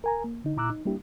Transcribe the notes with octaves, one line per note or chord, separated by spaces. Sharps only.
A#4 G#5 A#5
A#3
D3 D#4
A#2 E4 A#5 D6 E6 F#6
D#4
G3 A#3 D4 E4 G4